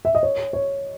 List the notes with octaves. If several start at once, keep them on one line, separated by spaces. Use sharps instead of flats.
E5
D#5
C#5
C#5